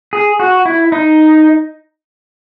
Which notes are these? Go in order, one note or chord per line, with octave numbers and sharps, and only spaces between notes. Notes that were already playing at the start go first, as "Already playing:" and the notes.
G#4
F#4
E4
D#4